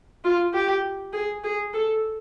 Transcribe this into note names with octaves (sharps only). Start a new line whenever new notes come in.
F4
G4
G#4
G#4
A4